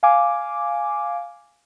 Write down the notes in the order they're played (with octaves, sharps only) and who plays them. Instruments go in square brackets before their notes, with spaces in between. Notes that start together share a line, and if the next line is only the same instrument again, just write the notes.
[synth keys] F5 G#5 D6